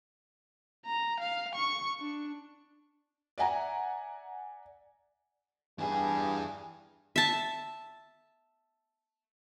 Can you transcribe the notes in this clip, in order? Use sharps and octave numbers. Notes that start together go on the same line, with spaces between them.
A#5
F5
C#6
D4
D5 E5 F#5 G#5 A#5
G2 E3 G#4
E5 A5